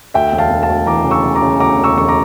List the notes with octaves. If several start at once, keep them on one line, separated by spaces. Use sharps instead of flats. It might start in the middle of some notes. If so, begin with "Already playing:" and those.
D2 E5 G5
E1
F5 A5
E1
F5 A5
D2
E3 A#5 D6
C#3
C#6 E6
C#3
A#5 D6
C#3
D2 A#5 D6
E1
C#6 E6
E1 C#6
A#5 D6